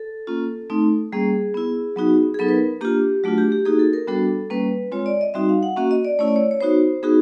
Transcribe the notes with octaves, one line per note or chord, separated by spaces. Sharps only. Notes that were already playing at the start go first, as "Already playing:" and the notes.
Already playing: A4
A#3 C#4 F4
A3 C4 D#4
G3 A#3 C#4 G#4
B3 E4
F#3 B3 D#4 F#4
G#4
F#3 B3 D#4 A4
B4
A#4
A#3 D4 F4 G4
F#3 A3 D4 F4 F#4
G4
G4
A#3 D#4 F#4 G#4
A4
A#4
G3 B3 D4 F#4 A4
G3 A#3 C#4 B4
G#3 C4 F4 C#5
D5
D#5
G3 C4 D#4 F#4 E5
F5
F#5
A#3 C#4 F#4 E5
D#5
D5
A3 C#4 E4 C#5
D5
C#5
C#5
B3 D#4 F#4 C5
B3 D#4 F#4 G#4